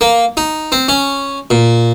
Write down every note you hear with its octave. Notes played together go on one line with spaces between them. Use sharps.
A#3
D#4
C4
C#4
A#2